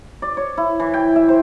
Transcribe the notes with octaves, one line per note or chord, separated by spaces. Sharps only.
D5
C#5
E4
E3
G5
E5
C5